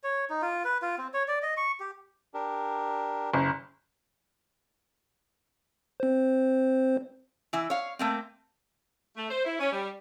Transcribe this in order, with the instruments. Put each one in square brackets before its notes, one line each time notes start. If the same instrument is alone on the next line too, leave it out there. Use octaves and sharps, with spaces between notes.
[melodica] C#5
D#4
F4
B4
F4
C4
C#5
D5
D#5
C#6
G4
[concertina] D4 G4 A#4
[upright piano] F#1
[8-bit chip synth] C4 C5
[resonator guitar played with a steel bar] E3 E4
C#5 F5
A3 A#3 C4
[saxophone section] A3
C5
E4
C#4
G3